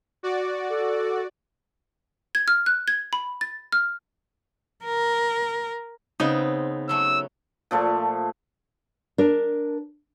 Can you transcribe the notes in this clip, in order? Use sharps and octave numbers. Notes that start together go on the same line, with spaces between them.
F#4 D5
A4
G#6
F6
F#6
G#6
B5
A6
F6
A#4
C#3 B3 C4 D#4
F#3 A3 E6
A#2 F3 A3
D4 A#4